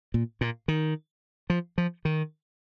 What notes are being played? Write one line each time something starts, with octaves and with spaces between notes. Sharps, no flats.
A#2
A#2
D#3
F3
F3
D#3